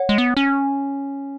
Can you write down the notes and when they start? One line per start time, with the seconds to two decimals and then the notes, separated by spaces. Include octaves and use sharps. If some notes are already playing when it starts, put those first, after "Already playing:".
Already playing: C#5 F#5
0.09 G#3
0.18 B3
0.37 C#4